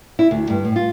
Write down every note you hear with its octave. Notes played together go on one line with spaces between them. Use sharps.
E4
D2
G2
A2
F4